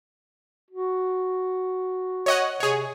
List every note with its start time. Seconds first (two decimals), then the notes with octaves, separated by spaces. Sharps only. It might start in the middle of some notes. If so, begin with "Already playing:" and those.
0.71 F#4
2.26 C#5 D#5 F#5
2.60 C3 G#4 C#5